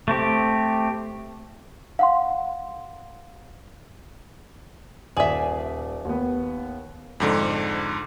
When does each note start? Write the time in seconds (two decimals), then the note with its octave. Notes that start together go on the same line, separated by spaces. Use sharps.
0.08 A3 C4 G4
1.99 F5 F#5 C6
5.17 D#1 G#4 D5 E5
6.05 D#2 B3
7.20 F2 G#2 D3